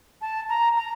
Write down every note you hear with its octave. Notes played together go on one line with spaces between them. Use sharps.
A5
A#5
A#5